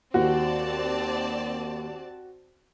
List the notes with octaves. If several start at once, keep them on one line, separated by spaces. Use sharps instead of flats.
D#2 C4 F#4 D5 A5